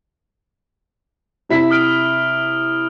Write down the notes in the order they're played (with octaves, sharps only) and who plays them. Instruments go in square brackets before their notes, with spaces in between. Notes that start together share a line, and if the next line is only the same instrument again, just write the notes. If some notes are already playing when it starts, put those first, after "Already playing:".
[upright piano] C3 E4 B6
[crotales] D#6 F6 D7